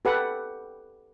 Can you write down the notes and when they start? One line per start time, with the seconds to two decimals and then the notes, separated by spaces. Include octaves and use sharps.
0.05 G4 A4 B4 F#5